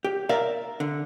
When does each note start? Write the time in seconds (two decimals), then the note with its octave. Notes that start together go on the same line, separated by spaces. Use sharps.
0.05 G4
0.29 A#4 D5 E5 F5 A#5
0.80 D3